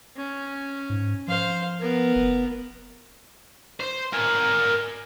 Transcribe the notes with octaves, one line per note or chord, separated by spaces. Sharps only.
C#4
G#2
F3 C5 F5
B3 A#4
F1
C5
A#4 G#5